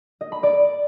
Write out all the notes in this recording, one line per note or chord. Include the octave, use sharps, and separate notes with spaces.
D#5
B5
D5